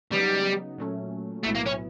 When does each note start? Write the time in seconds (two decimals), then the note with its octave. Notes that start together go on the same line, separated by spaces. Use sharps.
0.12 C#3 F#3 G3 B3 D#4
0.78 A#2 F#3 A3 C#4
1.44 B1 A2 F#3 A3 B3 E4
1.55 A#3
1.66 C#4